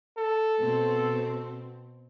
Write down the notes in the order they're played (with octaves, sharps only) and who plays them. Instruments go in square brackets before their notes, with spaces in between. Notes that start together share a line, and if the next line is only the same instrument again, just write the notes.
[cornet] A4
[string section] B2 C4